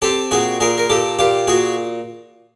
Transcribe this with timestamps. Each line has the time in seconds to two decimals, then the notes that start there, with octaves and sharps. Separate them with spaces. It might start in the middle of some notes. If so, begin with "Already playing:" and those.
0.02 C4 G4 A4
0.31 A#2 F#4 G#4
0.60 A#2 G#4 A#4
0.78 A#4
0.90 A#2 G4 A4
1.19 A#2 F4 G4
1.47 A#2 F#4 G#4